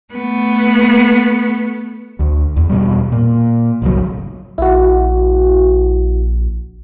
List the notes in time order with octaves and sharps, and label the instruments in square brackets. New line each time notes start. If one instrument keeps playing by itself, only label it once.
[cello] A3 B3
[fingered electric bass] D2
E2
E2 B2 G3
A#2
G1 C2 F#3
[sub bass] A#1 [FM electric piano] E4 F#4